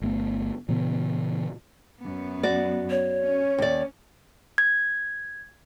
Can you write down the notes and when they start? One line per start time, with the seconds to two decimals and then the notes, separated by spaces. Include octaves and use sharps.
0.02 G1 A3 B3
0.69 A#2 C#3 E3 B3
2.02 F#2 B3
2.43 F#4 D5
2.90 C#5
3.21 C#4
3.58 D#2 D5
4.58 G#6